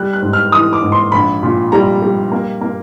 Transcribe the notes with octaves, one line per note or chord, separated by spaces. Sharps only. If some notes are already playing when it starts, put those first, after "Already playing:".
Already playing: G3 F#6
F#6
G#2
F6
E3 D#6
D6
G#2
C6
A#1 B5
A#2
G3 A#5
G3
A#3
A#3